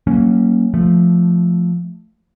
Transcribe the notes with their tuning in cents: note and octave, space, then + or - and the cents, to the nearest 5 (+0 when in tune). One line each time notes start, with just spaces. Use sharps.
F#3 +30 A#3 +0 C#4 +0
F3 +0 A3 +0